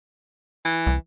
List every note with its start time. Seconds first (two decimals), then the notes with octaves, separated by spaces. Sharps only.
0.65 E3
0.87 C2